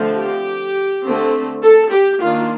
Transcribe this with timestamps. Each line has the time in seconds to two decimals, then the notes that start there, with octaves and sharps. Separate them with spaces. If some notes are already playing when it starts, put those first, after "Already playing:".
Already playing: D3 F3 A3 C4
0.16 G4
1.04 D3 A3 C4
1.62 A4
1.92 G4
2.21 D#3 A#3 D4 F4